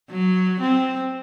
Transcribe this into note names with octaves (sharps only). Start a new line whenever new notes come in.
F#3
C4